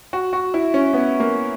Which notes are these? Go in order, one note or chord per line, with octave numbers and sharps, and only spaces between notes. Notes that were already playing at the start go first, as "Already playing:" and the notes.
F#4
F#4
E4
C#4
B3
A#3